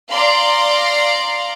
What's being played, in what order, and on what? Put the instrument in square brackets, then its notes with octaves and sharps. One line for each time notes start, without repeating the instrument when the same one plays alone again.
[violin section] D5 F5 A#5 C6